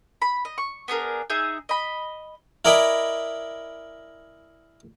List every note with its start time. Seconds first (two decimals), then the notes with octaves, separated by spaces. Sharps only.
0.22 B5
0.45 D#5
0.58 C#6
0.88 B3 D4 G#4 A#4
1.30 D#4 G#4 E5
1.69 D#5 B5
2.65 E4 A#4 D5 D#5 G#5 B5